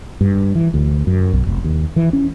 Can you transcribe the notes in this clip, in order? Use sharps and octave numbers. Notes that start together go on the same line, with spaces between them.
G2
E3
D2
F#2
B1
F1
D#2
E3
C#4